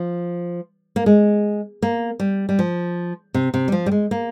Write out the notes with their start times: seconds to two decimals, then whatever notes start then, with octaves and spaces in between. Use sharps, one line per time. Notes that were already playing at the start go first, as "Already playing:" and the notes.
Already playing: F3
0.96 A#3
1.06 G#3
1.82 A#3
2.20 G3
2.49 G3
2.59 F3
3.34 C3
3.54 C3
3.68 G3
3.72 F3
3.86 G3
3.92 G#3
4.11 A#3